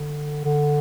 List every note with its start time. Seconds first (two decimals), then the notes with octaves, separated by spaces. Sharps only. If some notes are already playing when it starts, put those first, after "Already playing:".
Already playing: D3
0.45 D3